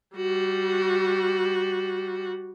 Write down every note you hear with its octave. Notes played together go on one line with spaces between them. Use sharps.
G3 F#4